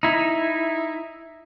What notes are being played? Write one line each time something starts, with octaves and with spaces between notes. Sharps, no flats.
D#4 E4